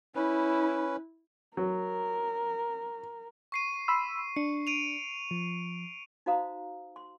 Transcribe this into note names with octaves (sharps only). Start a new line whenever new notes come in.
C#4 E4 B4
F#3 A#4
C#6 C7 D#7
B5 C6 E6
D4 C#7
D7 D#7 F7
F3
D#4 F#4 C5 F5 A#5 D#6
C6